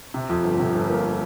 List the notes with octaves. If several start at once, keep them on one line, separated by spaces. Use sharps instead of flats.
C3
F2
G1
C3
G1
A#3